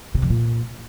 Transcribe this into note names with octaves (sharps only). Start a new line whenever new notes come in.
C3
F2
A#2